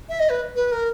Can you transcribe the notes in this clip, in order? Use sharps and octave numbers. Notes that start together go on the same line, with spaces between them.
E5
D#5
B4
B4
A#4